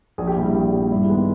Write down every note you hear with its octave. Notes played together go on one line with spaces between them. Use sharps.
A#1 G#4
G4
A#2 G3 E4
G4
A#1
A#2 G3
G2 E4
D#3 G#3 B3